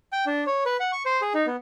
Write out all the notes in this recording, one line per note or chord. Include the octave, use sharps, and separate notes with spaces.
G5
D4
C#5
B4
F#5
C#6
C5
G#4
D#4
B3